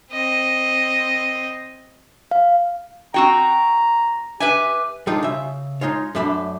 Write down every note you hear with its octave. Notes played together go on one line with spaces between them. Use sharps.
C4 D#5
F5
C4 F#4 G5 A#5
G4 B4 E5 G#5
G3 G#3 D4 D#4 F4
C#3 E5
G#3 D#4 F4 C#5
F#2 A3 D4 E5 B5